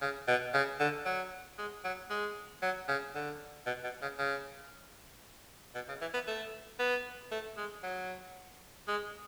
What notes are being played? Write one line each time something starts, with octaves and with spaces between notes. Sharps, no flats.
C#3
B2
C#3
D3
F#3
G#3
F#3
G#3
F#3
C#3
D3
B2
B2
C#3
C#3
B2
C#3
E3
B3
A3
B3
A3
G#3
F#3
G#3